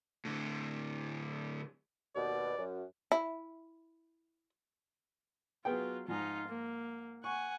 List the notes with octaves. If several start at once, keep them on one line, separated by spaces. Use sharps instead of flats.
A2 D3
D#2 B2 D5
F#2
E4
F#3 B3 F4 G#4 G5
G#2 F3 D#4 F4
A#3
F#5 G#5 C#6